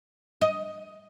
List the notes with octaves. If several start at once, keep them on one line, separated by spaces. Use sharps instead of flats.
D#5